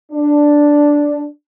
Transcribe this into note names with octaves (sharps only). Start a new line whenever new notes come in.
D4